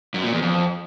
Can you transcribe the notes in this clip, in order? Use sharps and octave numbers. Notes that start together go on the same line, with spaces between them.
F#2
A#2
E2
F2